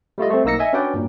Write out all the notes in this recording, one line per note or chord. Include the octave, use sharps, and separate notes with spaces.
G3 A3 F4 D#5
A3 C4
B1 A#3 D#4 E6 A#6 C#7
D#5 E5 G#5
C#4 D4 F#4 B4 D5 G5
G2 A#2